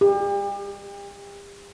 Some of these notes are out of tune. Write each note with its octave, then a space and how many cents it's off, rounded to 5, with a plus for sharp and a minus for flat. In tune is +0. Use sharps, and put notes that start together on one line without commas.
G4 +40